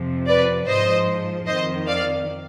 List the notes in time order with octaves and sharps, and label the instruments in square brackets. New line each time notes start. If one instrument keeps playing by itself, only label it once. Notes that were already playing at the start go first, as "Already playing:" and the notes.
Already playing: [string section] F2 C3 F3
B4 D5
G#2 F3 C5 D#5
F2 D#3 C5 D#5
D5 F5